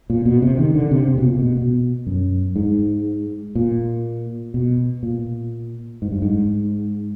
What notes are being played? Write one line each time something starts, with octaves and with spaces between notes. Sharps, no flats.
A#2
B2
C3
D#3
D3
C3
C3
B2
A#2
B2
B2
F#2
G#2
A#2
B2
A#2
G#2
G2
G#2